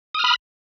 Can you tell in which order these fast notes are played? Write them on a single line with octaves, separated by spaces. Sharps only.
D#6 F6 B5